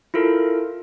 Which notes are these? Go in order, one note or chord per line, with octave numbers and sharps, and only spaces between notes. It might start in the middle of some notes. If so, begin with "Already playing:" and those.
E4 F4 A4 A#4